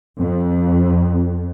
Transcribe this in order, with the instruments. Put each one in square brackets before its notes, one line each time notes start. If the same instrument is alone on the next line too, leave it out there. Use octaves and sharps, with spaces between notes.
[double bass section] F2